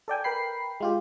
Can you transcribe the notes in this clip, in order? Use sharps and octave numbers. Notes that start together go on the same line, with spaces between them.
A4 D5 G5 G#5
A#4 B4 G5 B5 C7
G#3 F4 G4